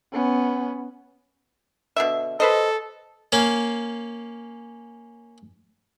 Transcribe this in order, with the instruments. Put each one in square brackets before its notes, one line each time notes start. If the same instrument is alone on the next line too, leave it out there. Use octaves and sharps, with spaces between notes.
[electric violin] B3 C#4
[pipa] B2 D3 E5
[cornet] A4 [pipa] B4 C5 D#5
[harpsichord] A#3 C#4 F5